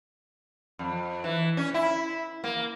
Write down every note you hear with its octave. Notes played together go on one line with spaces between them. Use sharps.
F2
E3
C#4
E4
A#3